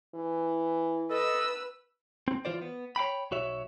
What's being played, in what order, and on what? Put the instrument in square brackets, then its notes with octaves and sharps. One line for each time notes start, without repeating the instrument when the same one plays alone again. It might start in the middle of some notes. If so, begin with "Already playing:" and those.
[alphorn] E3
[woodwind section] A4 D#5 [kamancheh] B4 E6
[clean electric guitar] C4
E3 F4 C5 D5
B3
C#5 F5 G5 B5
B1 F#4 C#5 E5